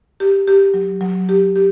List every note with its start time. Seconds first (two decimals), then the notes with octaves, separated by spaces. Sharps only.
0.20 G4
0.47 G4
0.74 F#3
1.01 F#3
1.29 G4
1.56 G4